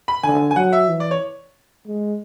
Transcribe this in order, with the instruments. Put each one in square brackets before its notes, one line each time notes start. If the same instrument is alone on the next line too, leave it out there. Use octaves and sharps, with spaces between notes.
[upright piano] B5
[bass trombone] D3 [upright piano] G#5
[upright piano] G#5
[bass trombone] F#3 [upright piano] F#5
[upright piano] E5
[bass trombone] E3
[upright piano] D5
C#5
[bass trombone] G#3